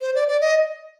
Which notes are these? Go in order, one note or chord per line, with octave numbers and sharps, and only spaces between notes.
C5
D5
D5
D#5